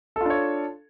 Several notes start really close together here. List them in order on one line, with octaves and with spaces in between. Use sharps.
A4 F4 D4 C#5